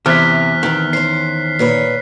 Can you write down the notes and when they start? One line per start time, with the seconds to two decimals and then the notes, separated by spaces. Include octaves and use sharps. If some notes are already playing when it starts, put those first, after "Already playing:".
0.06 E2 C3 F6 F#6 B6
0.63 D#3 B3 C4
0.93 C#4 C5 C7
1.59 A#2 B4 C#5